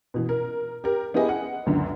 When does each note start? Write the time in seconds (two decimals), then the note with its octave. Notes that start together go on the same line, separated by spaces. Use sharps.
0.14 B2 E3
0.29 A#4
0.84 G4 A#4
1.14 B3 E4 G4 G#4 D#5 G#5
1.29 F#5
1.66 C#2 F#2 D3